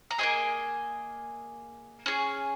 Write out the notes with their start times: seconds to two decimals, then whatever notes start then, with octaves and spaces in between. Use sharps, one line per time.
0.11 A#5
0.18 A#3 C#4 G#4 D#5 G#5
2.06 C#4 G#4